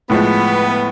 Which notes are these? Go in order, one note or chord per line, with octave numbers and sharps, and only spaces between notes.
A2 F3 G#3 B3